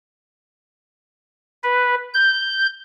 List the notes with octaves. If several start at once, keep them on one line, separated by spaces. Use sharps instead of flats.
B4
G6